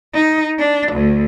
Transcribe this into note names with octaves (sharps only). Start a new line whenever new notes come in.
D#4
D4
D2